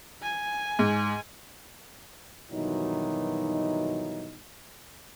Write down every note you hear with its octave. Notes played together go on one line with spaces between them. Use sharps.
G#5
G#2
G2 B2 D#3 E3 F#3 D#4